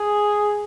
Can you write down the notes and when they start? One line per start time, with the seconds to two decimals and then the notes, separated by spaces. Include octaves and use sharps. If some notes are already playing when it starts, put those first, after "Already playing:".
Already playing: G#4